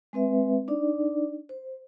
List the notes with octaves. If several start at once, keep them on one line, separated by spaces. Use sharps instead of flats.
G#3 C4 B4 E5
D4 D#4 D5
C5